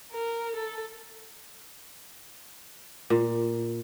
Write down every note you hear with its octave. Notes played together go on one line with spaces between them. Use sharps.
A#4
A4
A#2